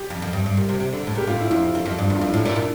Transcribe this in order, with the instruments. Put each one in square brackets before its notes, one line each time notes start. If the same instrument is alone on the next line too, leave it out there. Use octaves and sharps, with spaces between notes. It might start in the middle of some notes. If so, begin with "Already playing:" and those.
Already playing: [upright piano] G4
[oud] F2
F2
G2
G2
A#2
C3
C3
D3
A2
[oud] A#2 [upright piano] G4
[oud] A2 [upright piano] F4
[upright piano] E4
[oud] F2 [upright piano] F4
[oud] F2 [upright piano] F4
[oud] F2
[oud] G2 [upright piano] D4
[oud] E2
[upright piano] F4
[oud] F2 [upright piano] E4
[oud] A2
[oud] A#2 [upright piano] E4
[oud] A#2 [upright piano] E4